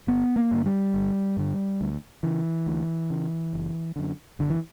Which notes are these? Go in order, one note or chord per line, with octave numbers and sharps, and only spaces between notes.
G1 B3
A#3
G2 D3
G3
G1
G2 D3
D2
C#3 E3
D2
C#3
F#1
F#2 D3
F#1 D3
E3